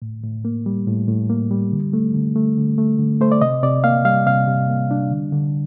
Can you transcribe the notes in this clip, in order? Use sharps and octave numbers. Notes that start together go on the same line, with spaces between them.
A2
A2
A#3
G3
A2
A2
A#3
G3
D3
A3
D3
A3
D3
A3
D3
A3 C5
D5
C3 D#5
C3 D5
A#3 F5
G3 F5
C3 F5
C3
A#3
G3 D4
D3
D3